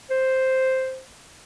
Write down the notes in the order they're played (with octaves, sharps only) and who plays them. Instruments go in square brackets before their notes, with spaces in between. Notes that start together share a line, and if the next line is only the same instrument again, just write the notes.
[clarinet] C5